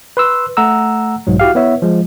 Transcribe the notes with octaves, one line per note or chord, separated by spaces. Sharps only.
B4 C6 E6
A3 F#5 A#5 E6
B1 G#2 F#3
E4 F#4 G4 F5
B3 E4 C#5 E5
F3 G#3